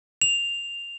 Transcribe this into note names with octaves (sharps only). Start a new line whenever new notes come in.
F7